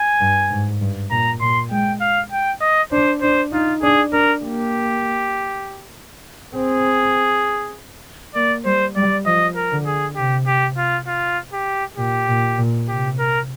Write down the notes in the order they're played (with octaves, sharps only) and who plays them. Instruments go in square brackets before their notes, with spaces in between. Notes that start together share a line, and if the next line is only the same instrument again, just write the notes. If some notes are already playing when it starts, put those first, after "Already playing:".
Already playing: [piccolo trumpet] G#5
[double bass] G2
G#2
G2
[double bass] A#2 [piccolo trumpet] A#5
[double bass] A#2 [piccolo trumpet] C6
[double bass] G#3 [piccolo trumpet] G5
[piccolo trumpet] F5
G5
D#5
[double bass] D4 [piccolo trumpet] C5
[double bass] D4 [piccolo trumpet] C5
[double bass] D#4 [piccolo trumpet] F4
[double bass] D4 [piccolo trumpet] G#4
[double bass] D4 [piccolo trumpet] A#4
[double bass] A#3 [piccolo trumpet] G4
[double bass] C4 [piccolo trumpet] G#4
[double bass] A#3 [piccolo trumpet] D5
[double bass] G3 [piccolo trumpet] C5
[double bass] G3 [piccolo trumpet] D5
[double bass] F3 [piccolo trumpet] D#5
[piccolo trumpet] A#4
[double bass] D3
[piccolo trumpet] G#4
[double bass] C3 [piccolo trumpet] G4
[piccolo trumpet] G4
F4
F4
G4
[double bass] A#2 [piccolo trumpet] G4
[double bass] A#2
A#2
[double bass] C3 [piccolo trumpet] G4
[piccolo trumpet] A#4